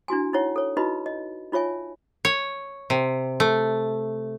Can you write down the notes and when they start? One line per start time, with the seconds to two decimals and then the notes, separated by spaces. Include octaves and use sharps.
0.08 D4 E4 F#4 G#5
0.33 D#4 E4 C#5 F#5
0.56 A4 C#5
0.77 D#4 E4 F#4 B4 D#5 B5
1.06 D#5
1.52 D#4 F4 C#5 E5 G#5
2.25 C#5
2.90 C3
3.40 A3